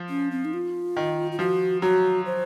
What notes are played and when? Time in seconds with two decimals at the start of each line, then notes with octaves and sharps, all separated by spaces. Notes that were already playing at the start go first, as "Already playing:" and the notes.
Already playing: F3
0.10 C#4
0.31 C4
0.45 D#4
0.54 F4
0.96 D#3
1.32 F4
1.39 F3 F#4
1.82 F#3 F#4
2.26 C5